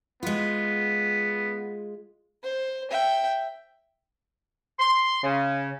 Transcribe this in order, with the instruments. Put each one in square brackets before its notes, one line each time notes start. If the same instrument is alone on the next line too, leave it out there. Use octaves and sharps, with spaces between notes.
[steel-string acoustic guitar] G#3 F4 [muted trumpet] B3
[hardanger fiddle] C5
E5 G5
[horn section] C6
C#3